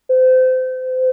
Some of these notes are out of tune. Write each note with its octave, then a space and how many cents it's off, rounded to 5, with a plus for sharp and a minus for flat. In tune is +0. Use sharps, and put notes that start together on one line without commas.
C5 -30